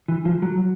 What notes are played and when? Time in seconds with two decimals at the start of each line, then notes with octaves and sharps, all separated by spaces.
0.08 E3
0.25 F3
0.42 F#3